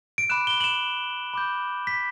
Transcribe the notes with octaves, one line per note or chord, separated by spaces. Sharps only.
D7
B5 D6 F#6 E7
G7
F#7
E7
B5 D6 G6
B6